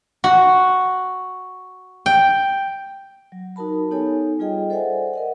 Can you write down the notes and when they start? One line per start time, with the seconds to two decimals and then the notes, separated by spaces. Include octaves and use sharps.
0.24 F#4
2.06 G5
3.32 F#3
3.56 D#4 F#4 A#4 A5 B5
3.91 B3 D#4 G4 A4 C#5 G#5
4.39 G3 F4 G#4 D#5 G5
4.70 A4 C5 D5 E5 F#5 G#5
5.14 A#4 D#5 F#5